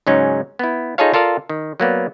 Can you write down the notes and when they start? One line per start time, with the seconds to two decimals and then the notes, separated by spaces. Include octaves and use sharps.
0.07 G#2 C#3 F#3 C#4 D#4
0.59 B3 E4
0.98 D#4 F4 G#4 A4 C#5 F5
1.14 F4 A4 A#4 D5 F5
1.49 D#3
1.80 F#3 A#3 B3 D5